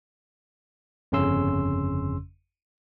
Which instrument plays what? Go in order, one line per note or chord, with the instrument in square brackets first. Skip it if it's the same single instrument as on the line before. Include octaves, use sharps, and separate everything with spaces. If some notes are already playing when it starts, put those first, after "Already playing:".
[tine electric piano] G1 F2 C#3 C#4 C6 E6